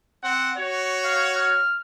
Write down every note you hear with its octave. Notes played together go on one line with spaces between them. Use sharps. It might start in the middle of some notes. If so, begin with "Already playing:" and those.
C4 F#5
F#4 C#5
F5
F6